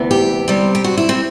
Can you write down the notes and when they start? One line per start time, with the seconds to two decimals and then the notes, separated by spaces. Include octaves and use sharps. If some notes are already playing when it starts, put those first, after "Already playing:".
Already playing: D2 C3 E3 B3
0.11 G4
0.48 C3 G3 C4
0.75 G4
0.84 F#4
0.98 E4
1.09 C4